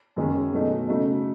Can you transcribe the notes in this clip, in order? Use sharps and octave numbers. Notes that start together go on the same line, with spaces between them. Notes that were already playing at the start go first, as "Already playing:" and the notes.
F#2 D#3 G#3 C#4
B2 F#3 A3 D#4
C#3 F#3 A3 D#4